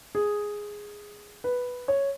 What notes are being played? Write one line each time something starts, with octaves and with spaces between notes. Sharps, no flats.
G#4
B4
C#5